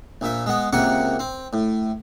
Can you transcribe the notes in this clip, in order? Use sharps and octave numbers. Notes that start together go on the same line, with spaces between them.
A#1 A#2 E5
G#3 B3
C#2 C3 A#3 F#5 C#6
C4
A2